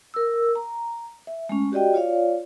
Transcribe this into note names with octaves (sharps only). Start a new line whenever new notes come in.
A#4 E6
A#5
E5
G#3 A3 C#4
F#4 G4 D5 D#5 G5
F4 C#5 D5 F5